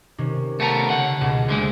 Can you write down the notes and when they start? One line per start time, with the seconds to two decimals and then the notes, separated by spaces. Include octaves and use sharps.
0.18 C3 D#3 C#4
0.60 A3 B3 A#4 C#5 A5 A#6
0.90 C#3 F#5
1.21 C#2 B2
1.49 D2 D3 G#3 C5